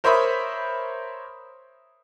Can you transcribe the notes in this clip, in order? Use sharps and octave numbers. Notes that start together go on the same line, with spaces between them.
A#4 C5 C#5 E5 B5 D#6